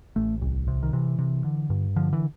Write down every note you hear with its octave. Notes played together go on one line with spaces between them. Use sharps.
A1 A3
C2
C3
D#3
C3 E3
C3
D3
G2
D3 F3
E3